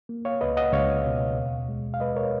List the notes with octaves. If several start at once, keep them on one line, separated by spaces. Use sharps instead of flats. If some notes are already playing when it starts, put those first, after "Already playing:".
A#3
C#5 F5
C#2 B4 D#5
D#5 F#5
C#2 C#5 F5
B2
D#2
G#3
F5
G#3 B4 D#5
A#4 C#5